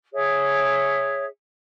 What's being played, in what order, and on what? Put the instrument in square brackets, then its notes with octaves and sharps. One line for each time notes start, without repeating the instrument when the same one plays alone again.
[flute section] G#4 C#5 E5